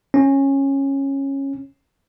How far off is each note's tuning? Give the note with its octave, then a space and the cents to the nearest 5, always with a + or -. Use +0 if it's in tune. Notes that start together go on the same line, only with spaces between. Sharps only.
C#4 -15